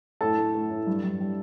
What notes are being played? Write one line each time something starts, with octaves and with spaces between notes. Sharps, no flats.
A2 A4 A5
A3
A3
A2
G2
G2
G3